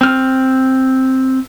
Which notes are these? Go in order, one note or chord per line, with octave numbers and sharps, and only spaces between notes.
C4 F6